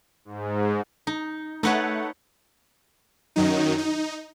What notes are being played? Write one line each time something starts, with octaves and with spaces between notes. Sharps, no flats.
G#2
D#4
A3 D#4 B4 C#5 F#5
F#2 D#3 F#3 D#4
D#4